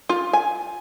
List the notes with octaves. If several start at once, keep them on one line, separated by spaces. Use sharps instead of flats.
F4
G#5